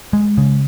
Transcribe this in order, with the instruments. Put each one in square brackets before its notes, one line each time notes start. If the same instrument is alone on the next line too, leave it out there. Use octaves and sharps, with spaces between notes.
[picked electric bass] G#3
C#3